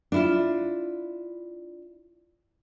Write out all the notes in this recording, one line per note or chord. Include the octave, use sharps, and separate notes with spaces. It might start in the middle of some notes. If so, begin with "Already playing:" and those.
D4 E4 F4